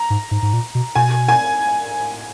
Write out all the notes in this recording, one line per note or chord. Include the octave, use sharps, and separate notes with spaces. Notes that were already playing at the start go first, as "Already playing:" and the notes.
Already playing: A#5
G#2
G#2
G#2
A#2
B2
B2 G#5
G#5